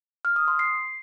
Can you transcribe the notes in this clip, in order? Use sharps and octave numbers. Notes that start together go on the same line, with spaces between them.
F6
D#6
C6
C7